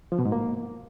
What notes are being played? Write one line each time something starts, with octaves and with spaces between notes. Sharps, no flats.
F3
B2
G#2
A#3